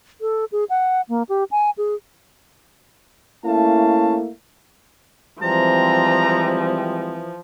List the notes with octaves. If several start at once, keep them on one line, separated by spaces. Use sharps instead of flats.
A4
G#4
F#5
A#3
G4
G#5
G#4
A3 A#3 C#4 E4 F5 A5
E3 F3 G3 G#3 C4 A#5